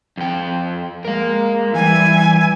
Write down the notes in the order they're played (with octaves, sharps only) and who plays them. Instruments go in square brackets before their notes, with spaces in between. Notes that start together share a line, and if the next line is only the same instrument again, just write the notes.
[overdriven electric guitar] F2 G5
[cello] G#3 A#3 [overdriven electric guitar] A#4 F5
[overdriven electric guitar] E3 [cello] G3 E4 [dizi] G#5